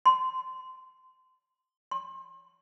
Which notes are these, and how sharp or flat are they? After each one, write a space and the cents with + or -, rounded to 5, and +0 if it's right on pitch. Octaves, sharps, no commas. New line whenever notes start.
C6 -20
C6 +35